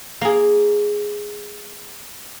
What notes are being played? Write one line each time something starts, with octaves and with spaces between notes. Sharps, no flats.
A#3 G#4